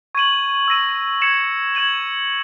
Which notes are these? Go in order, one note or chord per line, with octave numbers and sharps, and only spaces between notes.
C#6 G#6 D#7 F#7
E6 A#6 D#7
G#6 C#7 E7
G#6 D#7 F#7